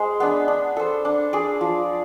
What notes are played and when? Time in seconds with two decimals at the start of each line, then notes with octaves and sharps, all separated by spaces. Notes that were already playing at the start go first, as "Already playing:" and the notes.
Already playing: G#3 G#4 C5
0.20 B3 D4
0.48 D4
0.77 A4 C5
1.05 D4
1.33 G#4 D5
1.61 F3